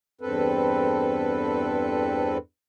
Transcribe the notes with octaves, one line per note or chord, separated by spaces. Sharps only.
E2 G2 C4 A4 B4